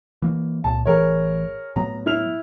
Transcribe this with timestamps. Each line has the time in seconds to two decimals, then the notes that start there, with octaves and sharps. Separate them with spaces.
0.22 E3 A#3
0.64 C#2 A#2 A5
0.86 A1 E3 G#4 A#4 C#5
1.76 A2 F#3 B3 A#5
2.06 E4 F6 F7